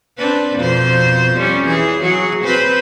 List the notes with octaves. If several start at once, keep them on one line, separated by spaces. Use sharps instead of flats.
C4 D4 B4
F2 B2 C5
G3 C#4
E3 G#4
F#3 G#4
C4 B4 C5